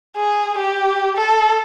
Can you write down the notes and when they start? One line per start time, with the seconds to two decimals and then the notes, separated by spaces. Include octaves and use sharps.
0.16 G#4
0.58 G4
1.17 A4